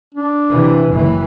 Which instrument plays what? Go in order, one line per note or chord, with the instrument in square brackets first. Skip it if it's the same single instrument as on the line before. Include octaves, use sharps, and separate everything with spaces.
[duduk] D4
[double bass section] C3 E3
F#1 E3